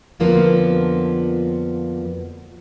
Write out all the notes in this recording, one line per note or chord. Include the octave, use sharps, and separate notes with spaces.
F2 D3 F3 A#3 B3 F4